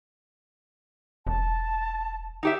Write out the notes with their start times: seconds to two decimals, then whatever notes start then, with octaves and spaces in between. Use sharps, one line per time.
1.27 E1 A5
2.43 D#4 G4 E5